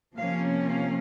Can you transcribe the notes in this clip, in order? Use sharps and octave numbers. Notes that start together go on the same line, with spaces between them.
C3 F3 A#3 C#4 F5
F5